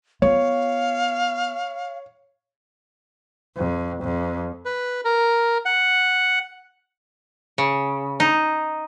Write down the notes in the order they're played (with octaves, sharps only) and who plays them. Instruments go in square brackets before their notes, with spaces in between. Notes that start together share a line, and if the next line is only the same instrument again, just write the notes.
[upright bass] B3 F4 [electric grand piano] C#5 [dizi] F5
[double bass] F2
F2
[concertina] B4
A#4
F#5
[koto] C#3
D#4